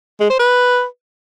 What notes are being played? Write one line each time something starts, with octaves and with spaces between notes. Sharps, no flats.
G#3
C5
B4